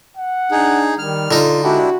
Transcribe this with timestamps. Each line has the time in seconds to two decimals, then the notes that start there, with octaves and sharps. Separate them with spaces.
0.17 F#5
0.51 D4 D#4 G#4
0.98 D#3 G3 F6
1.31 D3 D#4 F4
1.64 G#3 D4 E4 F#4 G4